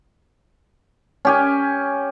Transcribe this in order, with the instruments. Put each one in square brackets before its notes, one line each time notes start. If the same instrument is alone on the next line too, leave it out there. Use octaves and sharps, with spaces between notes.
[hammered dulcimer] C#4 G4 G#5